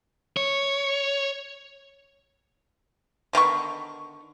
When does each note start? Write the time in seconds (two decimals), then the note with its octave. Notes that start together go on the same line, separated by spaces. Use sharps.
0.37 C#5
3.33 D3 D#3 B3 C#6